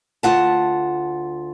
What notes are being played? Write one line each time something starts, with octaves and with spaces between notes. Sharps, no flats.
D2 F4 F#5 A5